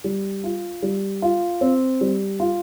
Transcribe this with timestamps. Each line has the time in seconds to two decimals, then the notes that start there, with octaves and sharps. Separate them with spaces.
0.04 G3
0.44 F4
0.83 G3
1.22 F4
1.61 C4
2.01 G3
2.40 F4